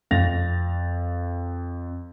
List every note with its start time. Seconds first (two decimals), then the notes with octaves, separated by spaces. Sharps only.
0.11 F2 F5 A6 A#6 F7